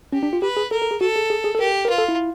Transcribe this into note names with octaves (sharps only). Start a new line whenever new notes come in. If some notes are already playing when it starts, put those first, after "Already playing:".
C#4 G4
D4
F4
G4 B4
G#4
A4 A#4
A4
G#4
F#4 A4
G#4
G#4
G#4
A4
G4 A#4
A#4
F4 B4
A4
E4